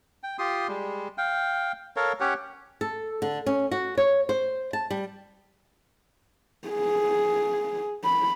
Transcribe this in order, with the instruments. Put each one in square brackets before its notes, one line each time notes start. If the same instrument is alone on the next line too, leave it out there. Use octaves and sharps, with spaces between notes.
[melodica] G5
F4 G4 C6 D#6
G3 G#3
F5 G5
A4 A#4 C#5 F5
C#4 G4 C#5 F#5
[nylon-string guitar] A4
D3
C#4
F#4
C#5
C5
A5
G3
[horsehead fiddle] G#4
B5